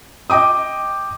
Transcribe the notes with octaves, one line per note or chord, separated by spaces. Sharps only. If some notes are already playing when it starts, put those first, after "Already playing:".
D#5 G5 D6 D#6